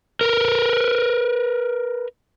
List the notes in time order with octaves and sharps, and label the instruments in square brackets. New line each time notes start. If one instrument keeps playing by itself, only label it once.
[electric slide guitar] A#4 B4